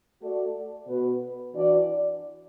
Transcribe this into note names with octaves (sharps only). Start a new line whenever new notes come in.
A3 F#4 A4 D5
B2 B3 F#4 B4
E3 D4 F#4 D5